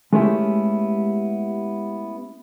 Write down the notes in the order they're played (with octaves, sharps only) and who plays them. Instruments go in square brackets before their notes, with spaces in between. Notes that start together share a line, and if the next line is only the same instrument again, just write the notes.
[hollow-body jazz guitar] G#3 A3 B3 C#4 E4 G4